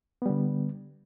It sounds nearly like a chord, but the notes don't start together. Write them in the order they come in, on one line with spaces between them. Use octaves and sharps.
B3 G3 D3